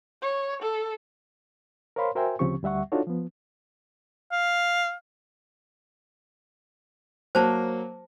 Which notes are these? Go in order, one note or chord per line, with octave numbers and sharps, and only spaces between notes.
C#5
A4
A#4 C5 C#5 F5 B5 C6
F#4 A#4 C5 E5 G5 G#5
D2 C#3 F3 C4 G4 C#6
D2 G3 E5 F#5 C#6
D4 D#4 F4 F#4 A4 C#5
F3 B3
F5
F#3 A#3 C5 A5